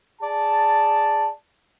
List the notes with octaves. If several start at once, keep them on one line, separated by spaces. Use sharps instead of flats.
G#4 D5 A5